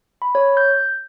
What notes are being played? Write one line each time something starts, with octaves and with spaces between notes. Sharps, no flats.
B5
C#5
G6